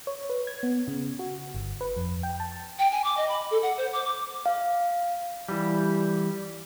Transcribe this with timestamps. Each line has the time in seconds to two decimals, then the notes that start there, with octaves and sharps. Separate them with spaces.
0.07 C#5
0.29 B4
0.47 G#6
0.63 B3
0.88 C#3
1.19 F#4
1.54 G1
1.81 B4
1.97 F2
2.23 G5
2.40 A5
2.79 G5
2.92 G#5
3.04 D6
3.17 D#5
3.28 B5
3.51 A4
3.62 F#5
3.77 C5
3.93 D6
4.05 D6
4.46 F5
5.49 E3 G3